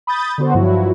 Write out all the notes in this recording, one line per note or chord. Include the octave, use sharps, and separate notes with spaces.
B5 D#6 G6 A6
D3 B3 F#4 C5
G2 F3 F#3 E4 F#4